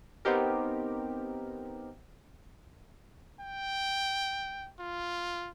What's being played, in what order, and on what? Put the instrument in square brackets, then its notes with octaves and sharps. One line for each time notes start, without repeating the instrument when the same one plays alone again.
[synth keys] B3 C4 D#4 G4 A#4
[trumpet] G5
F4